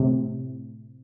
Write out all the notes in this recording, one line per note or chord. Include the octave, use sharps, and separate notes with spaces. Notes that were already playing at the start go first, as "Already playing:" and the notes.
Already playing: A2 C3